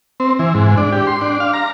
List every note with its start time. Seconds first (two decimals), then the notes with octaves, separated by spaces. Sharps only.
0.20 C4
0.39 E3
0.55 G#2
0.77 D4
0.92 G4
1.07 C6
1.21 D4
1.40 F5
1.54 A#5